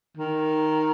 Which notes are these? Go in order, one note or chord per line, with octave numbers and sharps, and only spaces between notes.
D#3